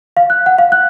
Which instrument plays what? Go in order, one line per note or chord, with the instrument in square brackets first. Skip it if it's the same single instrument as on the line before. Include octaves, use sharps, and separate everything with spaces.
[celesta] F5
F#6
F#5
F5
F#6